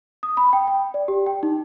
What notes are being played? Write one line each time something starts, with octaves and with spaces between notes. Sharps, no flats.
D#6
B5
G5
G5
D5
G4
G5
D#4